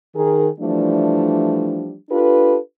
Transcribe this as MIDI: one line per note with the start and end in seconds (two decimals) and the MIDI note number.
0.16 0.49 51
0.16 0.49 68
0.16 0.49 70
0.60 1.95 52
0.60 1.95 53
0.60 1.95 55
0.60 1.95 57
0.60 1.95 62
2.10 2.57 62
2.10 2.57 65
2.10 2.57 67
2.10 2.57 69
2.10 2.57 71